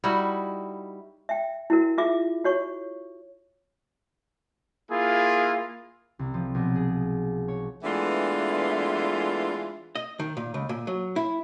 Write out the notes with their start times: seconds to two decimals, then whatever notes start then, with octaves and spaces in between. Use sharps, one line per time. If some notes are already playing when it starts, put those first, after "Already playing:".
0.04 G3 D#4 E4 F#4
1.29 E5 G5
1.70 E4 F#4 A#4
1.98 F4 G#4 E5 D6
2.44 F#4 C#5 C#6
4.90 A#3 E4 F4 G#4
6.19 C2
6.34 F3
6.55 B1
6.75 G#4
7.48 C#5
7.83 E3 G#3 A3 B3 D4 F4
9.96 D#5
10.20 D#3
10.37 A#2
10.54 C#2
10.69 A#2
10.87 F#3
11.16 E4